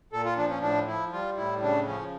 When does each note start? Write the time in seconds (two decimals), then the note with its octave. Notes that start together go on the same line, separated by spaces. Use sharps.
0.13 A#2 A4
0.25 F4
0.37 F3 D4
0.50 C#4
0.62 A2 D4
0.87 F3 E4
1.12 G3 F4
1.37 A2 E4
1.62 C#3 D4
1.87 F3 C#4